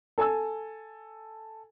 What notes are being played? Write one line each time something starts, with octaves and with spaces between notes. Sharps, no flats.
A4 G#5 A5 E6